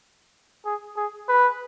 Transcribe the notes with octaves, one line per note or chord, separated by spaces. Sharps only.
G#4
G#4
B4